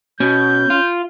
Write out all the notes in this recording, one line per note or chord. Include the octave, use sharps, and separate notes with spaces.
B2 C#4 G6
F4